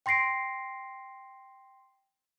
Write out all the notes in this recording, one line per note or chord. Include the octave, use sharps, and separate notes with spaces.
G5 C6 A#6 C7 D7